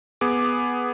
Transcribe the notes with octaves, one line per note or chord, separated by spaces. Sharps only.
B3 G#4 D6